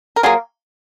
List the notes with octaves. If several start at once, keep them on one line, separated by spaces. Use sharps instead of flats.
A#4
F#3 A#3 F4 G#4